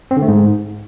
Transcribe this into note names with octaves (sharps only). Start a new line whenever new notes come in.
C4
D3
A3
G#2